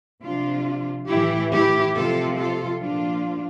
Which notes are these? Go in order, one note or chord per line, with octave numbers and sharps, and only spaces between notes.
C3 F3 D4 F4
A2 E3 E4 G4
E4 G4
C3 F3 F4 A4
F4 A4
A#2 F3 D4 F4